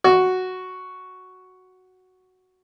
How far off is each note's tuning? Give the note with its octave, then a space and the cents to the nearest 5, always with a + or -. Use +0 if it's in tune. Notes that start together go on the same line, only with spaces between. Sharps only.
F#4 +0